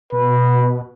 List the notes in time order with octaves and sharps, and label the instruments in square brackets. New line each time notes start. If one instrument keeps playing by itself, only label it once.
[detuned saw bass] B2 [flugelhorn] B4